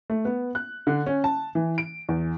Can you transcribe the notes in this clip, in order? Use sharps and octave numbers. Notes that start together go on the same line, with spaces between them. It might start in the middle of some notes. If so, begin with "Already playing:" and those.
A3
B3
F#6
D3
C#4
A5
E3
D7
E2